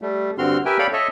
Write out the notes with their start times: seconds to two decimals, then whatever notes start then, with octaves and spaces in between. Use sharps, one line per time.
0.02 G3 A3
0.38 G2 D3 C4 F#4 C6 F6
0.65 G4 A#4 B4 E5 G5 G#5
0.79 A4 C#5 D5 F5 G5 B5
0.93 A4 C#5 D#5 E5